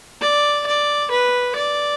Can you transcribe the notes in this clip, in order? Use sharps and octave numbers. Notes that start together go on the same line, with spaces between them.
D5
D5
B4
D5